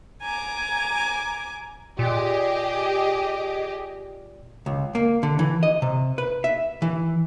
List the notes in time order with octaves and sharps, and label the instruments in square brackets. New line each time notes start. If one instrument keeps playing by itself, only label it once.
[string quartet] G#5 A#5 D6
[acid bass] A#2 [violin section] G4 G#4 D#5
[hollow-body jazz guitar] C#2
A#3
D3
E3
D#5
C3
B4
E5
E3